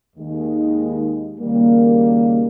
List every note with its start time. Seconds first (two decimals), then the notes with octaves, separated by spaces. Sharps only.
0.16 D#2 D#3 G#3 D#4
1.39 D#2 C#3 G3 A#3